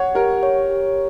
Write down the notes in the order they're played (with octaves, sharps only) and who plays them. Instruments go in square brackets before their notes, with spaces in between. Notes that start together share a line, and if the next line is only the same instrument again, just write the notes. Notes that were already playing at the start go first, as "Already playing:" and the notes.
Already playing: [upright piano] C#5 [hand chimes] F#5
[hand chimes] G4 [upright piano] A#4
[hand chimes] C#5
G4